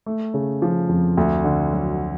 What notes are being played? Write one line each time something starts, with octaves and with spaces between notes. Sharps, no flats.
A3
C#3
F3
F2
D2
D3
F#3